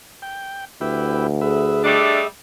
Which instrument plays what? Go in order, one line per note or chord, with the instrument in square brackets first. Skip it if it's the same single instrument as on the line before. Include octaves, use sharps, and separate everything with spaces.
[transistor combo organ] G5
[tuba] D2 [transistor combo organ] E4 G4 B4
[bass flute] G#4 [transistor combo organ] B4 E5
[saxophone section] G3 A3 D4 [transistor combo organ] D#5 E5